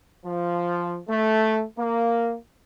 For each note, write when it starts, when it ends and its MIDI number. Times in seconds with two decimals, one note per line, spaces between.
0.24 0.98 53
1.09 1.63 57
1.78 2.36 58